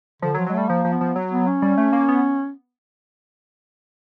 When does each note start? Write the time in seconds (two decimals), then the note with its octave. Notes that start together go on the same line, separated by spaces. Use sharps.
0.22 D3 F3
0.34 F#3
0.39 F3
0.47 F#3
0.50 G#3
0.54 G3 A3
0.69 F3 A#3
0.85 F3
0.92 B3
1.01 F3
1.16 F#3
1.32 B3
1.47 C#4
1.62 G3
1.78 A3
1.93 A#3
2.08 B3